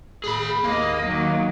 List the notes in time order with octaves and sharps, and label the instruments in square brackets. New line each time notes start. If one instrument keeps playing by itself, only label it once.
[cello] A2 [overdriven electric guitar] G#4 B5
[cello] D#2 D#5 [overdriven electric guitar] A#3
[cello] D#3 F#3